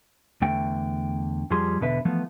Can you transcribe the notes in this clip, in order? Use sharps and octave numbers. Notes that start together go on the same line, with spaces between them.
E2 D3 A3 G5
F2 F3 G3 G#4 C6
E2 B2 D3 B4 E5
E3 F3 A3 B3